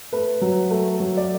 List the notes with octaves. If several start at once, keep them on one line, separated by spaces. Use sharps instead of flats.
A3 B4
F#3
A3
F#3
D5